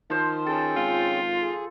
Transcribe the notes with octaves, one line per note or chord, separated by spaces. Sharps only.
D#3 F3 C5
C#4 G#4 A4 G5
G#1 F4
G#4